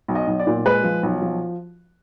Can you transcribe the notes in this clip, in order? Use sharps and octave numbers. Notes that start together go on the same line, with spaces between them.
B1
D#5
B1
D5
A#2
G#3 B4
F3
B1
F3